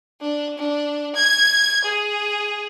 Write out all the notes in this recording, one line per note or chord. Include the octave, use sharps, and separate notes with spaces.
D4
D4
G#6
G#4